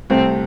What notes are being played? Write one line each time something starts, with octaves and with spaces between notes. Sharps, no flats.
C2 C3 A3 C4